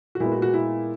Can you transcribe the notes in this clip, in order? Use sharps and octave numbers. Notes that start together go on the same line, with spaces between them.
F#4
A#2 G#3 B3 E4
F#4
F#4
E4